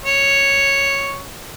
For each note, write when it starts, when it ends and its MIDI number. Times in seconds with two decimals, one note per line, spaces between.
0.04 1.23 73